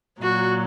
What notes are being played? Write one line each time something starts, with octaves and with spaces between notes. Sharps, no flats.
A#2 F#3 F#4